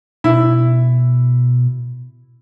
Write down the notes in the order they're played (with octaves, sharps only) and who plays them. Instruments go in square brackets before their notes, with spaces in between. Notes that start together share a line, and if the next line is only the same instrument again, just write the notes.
[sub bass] B2 [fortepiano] E4